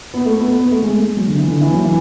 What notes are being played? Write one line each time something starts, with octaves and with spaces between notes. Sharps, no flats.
B3
A3
B3
B3
B3
A3
G#3
G#3
F#3
D3
E3
D3
E3
F#3
E3